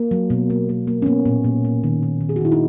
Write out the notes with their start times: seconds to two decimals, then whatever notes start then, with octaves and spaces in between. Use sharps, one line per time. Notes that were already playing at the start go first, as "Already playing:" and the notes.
Already playing: A#3
0.11 F#3
0.30 B2
0.50 A#3
0.69 A#3
0.87 A#3
1.02 C#4
1.06 A#3 B3
1.26 A#2
1.44 A#2
1.65 A#2
1.84 D#3
2.03 D#3
2.21 D#3
2.29 G#4
2.36 F#4
2.41 D#3 E4
2.52 D#4